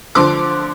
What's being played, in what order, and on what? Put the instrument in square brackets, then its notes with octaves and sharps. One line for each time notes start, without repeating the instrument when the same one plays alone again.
[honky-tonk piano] D3 F3 C6 D6